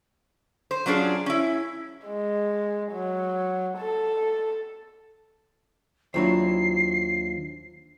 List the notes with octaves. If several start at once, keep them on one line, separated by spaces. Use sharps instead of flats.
C5
F#3 C#4 D4 F4 G#4
C#4 E4
G#3
F#3
A4
D#2 F#3 D4 E4 F4 C5 C7